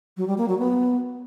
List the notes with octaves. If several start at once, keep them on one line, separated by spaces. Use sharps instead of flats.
F#3
G3
A#3
F#3
B3